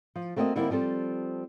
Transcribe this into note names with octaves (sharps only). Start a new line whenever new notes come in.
F3
A3 A#3 C4 F#4 D5 D#5
D3 G3 A#3 C4 D#4 E4
F3 G3 C4 A4 C5